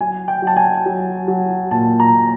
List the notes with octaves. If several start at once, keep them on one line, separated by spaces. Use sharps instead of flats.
F#3 G#5
G5
F#3 A5
G#5
F#3
F#3
A#2 A5
A#5
A#2